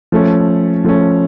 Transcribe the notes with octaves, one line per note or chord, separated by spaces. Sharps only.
F3 A3 C#4
F3 A3 C#4